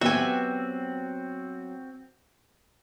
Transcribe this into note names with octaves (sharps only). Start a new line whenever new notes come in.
F#3 B3 C4 F#4 G4 E5 G#5